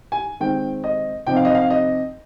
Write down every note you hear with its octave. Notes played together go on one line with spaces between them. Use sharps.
G#5
D#3 G#3 C4 G5
D#5
C3 F3 C4 D#4 G5
F5
D#5
F5
D#5